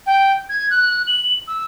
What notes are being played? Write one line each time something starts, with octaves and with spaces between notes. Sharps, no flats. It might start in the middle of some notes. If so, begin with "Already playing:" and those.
G5
G#6
F#6
F#7
E6